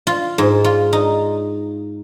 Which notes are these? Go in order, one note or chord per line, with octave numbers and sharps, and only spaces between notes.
F4
G#2
F4
D#4